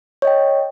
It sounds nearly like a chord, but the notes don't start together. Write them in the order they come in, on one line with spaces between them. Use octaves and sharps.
C#5 D#5 G5